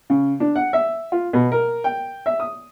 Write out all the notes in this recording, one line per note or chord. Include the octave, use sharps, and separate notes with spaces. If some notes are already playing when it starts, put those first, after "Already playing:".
C#3
D4
F#5
E5
F4
B2
A#4
G5
E5
D#6